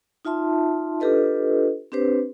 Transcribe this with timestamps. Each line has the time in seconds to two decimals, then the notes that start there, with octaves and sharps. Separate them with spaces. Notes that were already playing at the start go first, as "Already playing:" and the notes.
0.25 D#4 F4 E5 A5 C6
1.00 D4 F4 G4 A4 B4 D#5
1.92 C4 D4 G4 B4 C5